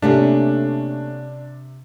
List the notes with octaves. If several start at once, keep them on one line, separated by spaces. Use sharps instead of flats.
C3 A3 A#3 C#4 D4